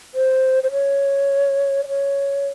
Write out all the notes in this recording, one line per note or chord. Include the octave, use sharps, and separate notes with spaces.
C5
C5
C#5
D5
C#5